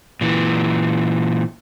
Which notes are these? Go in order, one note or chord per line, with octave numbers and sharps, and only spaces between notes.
A#2 E3